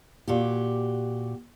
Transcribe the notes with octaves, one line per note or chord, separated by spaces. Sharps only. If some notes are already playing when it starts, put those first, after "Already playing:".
A#2 F#4 G4